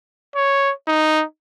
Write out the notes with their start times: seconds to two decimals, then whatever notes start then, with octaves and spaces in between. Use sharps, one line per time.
0.36 C#5
0.88 D#4